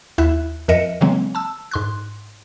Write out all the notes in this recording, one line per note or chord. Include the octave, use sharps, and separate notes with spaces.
D#2 E4 E5 F#6
F2 F3 A#4 D#5 E5 C#7
C#3 E3 F#3 G#3 A#3 C4
A5 E6
G#2 C6 F#6